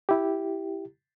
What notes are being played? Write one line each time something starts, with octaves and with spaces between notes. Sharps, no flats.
E4 G4